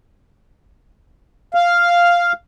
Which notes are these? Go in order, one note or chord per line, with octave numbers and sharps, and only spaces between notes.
F5